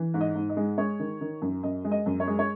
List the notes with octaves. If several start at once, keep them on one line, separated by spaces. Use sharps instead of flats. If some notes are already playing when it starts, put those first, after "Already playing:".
Already playing: E3
G#2
D#5
G#2
D#5
G#3
G#3 C#5
D#3
D#3
F#2
F#2 D#5
G#3
D#5
F#2
C#5
G#3
C#5